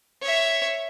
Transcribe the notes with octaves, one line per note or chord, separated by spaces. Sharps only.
C#5 E5